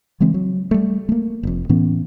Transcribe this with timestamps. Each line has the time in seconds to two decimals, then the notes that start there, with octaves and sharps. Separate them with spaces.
0.20 C#3 E3 G#3 C4
0.34 F#3
0.71 G3 A3
1.09 A3 A#3
1.43 F1 F2
1.69 A2 E3 B3 C#4